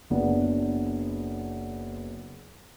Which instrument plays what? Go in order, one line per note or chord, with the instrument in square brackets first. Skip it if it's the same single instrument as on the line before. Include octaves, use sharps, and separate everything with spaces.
[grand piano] F#1 B3 D4